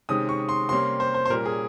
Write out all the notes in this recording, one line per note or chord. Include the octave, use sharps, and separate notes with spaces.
C3 D#3 G#3 C#4 D#6
C#6
C6
C3 G3 A#3 C#4 C6
C5
C5
C5
A#2 G3 C#4 A#4
G#4